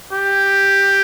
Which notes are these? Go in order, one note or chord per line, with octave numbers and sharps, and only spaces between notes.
G4